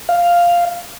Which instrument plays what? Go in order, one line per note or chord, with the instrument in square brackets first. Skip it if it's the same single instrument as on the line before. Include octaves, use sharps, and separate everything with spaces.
[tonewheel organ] F5